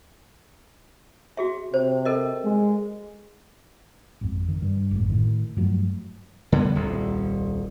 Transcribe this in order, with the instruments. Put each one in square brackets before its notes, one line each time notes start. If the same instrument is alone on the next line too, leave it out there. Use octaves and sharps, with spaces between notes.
[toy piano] F#4 G#4 E5
[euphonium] C3 [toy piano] C5
[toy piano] A4 A#4 D#5
[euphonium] G#3
[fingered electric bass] G#1 F2
D#3
G2
G#1 F#2 A2
A2 D#3
G2 F3 F#3 A3
[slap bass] D3 G3 B3
D#1 C2